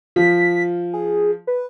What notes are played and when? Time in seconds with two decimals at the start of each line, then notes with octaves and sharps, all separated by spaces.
0.16 F3 B6
0.93 G#4
1.47 B4